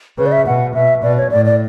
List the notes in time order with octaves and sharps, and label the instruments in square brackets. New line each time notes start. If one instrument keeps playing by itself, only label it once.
[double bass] C#3 [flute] B4
[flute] D5
E5
[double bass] B2 [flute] F#5
[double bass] B2 [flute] E5
[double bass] B2 [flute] D5
[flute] C#5
[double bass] A2 [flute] D5
[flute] D5